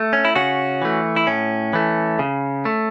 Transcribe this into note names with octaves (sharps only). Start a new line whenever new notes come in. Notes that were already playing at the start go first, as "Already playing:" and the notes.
Already playing: A3
C#4
E4
C#3 C#4 F#4
E3 A3
E4
A2 C#4
E3 A3
C#3
A3